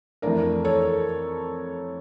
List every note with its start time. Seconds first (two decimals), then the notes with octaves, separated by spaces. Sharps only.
0.22 F2 E3 A3 D4 A#4 D5
0.64 A4 C#5